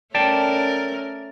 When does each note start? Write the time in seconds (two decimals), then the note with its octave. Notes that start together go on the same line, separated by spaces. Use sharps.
0.15 A3 C#4 A#4 D5 G5 A5